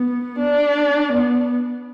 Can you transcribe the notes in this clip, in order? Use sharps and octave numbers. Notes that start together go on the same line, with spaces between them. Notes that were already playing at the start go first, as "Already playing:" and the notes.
Already playing: B3
D4
B3